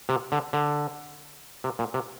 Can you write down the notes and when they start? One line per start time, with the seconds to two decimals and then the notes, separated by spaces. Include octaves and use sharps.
0.09 C3
0.32 D3
0.53 D3
1.64 C3
1.79 A#2
1.94 C3